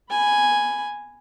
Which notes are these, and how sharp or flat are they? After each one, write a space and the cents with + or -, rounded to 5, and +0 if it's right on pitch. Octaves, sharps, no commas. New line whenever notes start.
G#5 +0 B5 +0